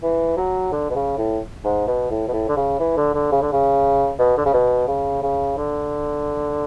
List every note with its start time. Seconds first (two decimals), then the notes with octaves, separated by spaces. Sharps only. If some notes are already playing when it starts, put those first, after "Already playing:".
0.03 E3
0.37 F#3
0.72 D3
0.90 B2
0.95 C#3
1.18 A2
1.64 G#2
1.87 B2
2.10 A2
2.28 B2
2.33 A2
2.48 D3
2.57 C#3
2.80 E3
2.97 D3
3.14 D3
3.32 C#3
3.42 D3
3.52 C#3
4.19 B2
4.37 D3
4.45 C#3
4.53 B2
4.88 C#3
5.22 C#3
5.57 D3